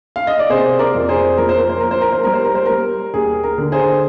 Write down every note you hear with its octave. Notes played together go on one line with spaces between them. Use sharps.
F5
D#5
D5
C3 G#4 C5
A#4 D5
F2
G#4 C5
F3 A#4
C5
A#4
C5
A#3 A#4
C5
A#4
C5
G3 A#4
C5
A#4
C5
G3 A#4
D#2 G#4
A#4
D3
G#4 C5